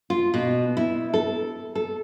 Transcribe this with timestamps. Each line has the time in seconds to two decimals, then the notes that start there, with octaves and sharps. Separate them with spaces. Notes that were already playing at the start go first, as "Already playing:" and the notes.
0.10 F4
0.34 B2
0.77 E4
1.14 A4
1.75 A4